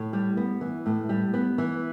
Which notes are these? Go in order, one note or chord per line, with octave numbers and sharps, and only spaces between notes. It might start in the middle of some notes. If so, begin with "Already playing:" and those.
Already playing: A2
G3
B3
E3
A2
G3
B3
E3